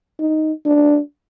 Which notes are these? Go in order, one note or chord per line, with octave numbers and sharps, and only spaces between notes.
D#4
D4